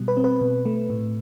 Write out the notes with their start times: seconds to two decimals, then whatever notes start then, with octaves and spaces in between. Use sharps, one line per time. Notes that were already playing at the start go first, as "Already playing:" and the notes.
Already playing: B2 G3
0.08 B4
0.17 C4
0.24 B4
0.41 B2
0.65 A3
0.90 A2